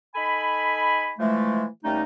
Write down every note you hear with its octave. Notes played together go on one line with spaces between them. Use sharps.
D#4 A4 G#5 B5
E3 F3 G#3 A3
D#2 G3 A3 C#4 D#4